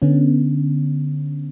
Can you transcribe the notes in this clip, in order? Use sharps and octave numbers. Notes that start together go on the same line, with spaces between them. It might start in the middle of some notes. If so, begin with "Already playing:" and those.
D3 B3 C#4